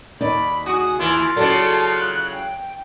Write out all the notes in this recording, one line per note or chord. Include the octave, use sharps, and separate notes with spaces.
D#2 D#4 D5 B5
F#4 G#4 D#6
D#2 E3 F4
C#3 F#3 F#4 A4 D5 A5
F#6
G5